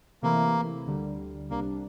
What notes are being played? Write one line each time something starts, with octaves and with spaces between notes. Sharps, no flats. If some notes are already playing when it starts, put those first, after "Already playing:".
C3 E3 A3 A#3 E4
D2 D3 G3
C2 C3 G3 A#3 D4